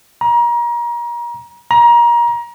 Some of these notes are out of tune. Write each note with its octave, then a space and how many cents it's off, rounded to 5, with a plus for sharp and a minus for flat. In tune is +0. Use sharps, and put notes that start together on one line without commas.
A#5 +30
A#5 +25